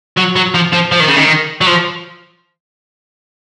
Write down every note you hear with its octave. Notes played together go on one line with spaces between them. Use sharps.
F#3
F#3
F3
F3
F3
D#3
C#3
D#3
F#3
F3